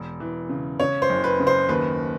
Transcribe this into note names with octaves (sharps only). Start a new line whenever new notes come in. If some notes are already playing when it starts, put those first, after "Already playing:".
Already playing: E1
E3
C#3
C#3 C#5
C5
F#1
B4
C#3
C5
D#2 B4